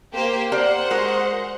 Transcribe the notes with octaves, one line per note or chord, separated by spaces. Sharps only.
A#3 G4 C5
A#3 G4 C5 D5 F#5
G#3 F#4 A#4